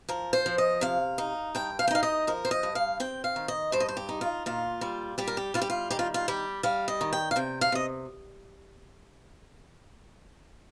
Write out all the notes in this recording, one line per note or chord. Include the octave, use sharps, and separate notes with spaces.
F3 A#4
C5
F3
D#5
C3 F5
D#4
G2 G5
F5
G5
D#4 F5
D#5
F3 A#4
C5
D#5
G2
F5
C4 G5
F5
D#3
D#5
G2 C5
D#5
C5
G4
D#4
F4
A#2 F4
G3
G3 G4
A#4
G4
G3 F4
G4
F4
D#3 G4
F4
F4
G3 G4
G3 F5
D#5
D#3
G5
F5
C3 G5
F5
C3 D#5